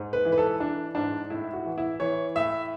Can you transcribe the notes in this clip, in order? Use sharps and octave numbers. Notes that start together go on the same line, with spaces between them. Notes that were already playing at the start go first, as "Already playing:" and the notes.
Already playing: G#2
B4
E3
B4
A4
E3 D4
G#2 D4
A2 E4
F#4
E3
E4
E3 C#5
A2 E5